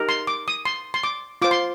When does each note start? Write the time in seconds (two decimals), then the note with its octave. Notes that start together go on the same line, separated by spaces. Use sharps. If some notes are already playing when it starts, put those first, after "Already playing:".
Already playing: D#4 G4 A#4
0.09 C6
0.27 D6
0.48 D#6
0.65 C6
0.94 C6
1.04 D6
1.42 F4 C5 D6
1.51 C6